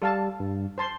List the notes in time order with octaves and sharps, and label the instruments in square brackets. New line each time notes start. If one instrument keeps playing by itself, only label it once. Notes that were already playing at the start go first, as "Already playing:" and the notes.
[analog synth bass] G3 [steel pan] A4 F5 A5
[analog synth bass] G2
[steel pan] C5 A5 C6